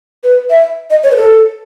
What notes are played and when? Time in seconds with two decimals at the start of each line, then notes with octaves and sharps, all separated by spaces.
0.24 B4
0.50 E5
0.90 D#5
1.03 C#5
1.11 B4
1.17 A4